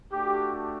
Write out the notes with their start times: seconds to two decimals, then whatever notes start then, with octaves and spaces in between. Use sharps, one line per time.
0.12 A3 D4 F#4 G4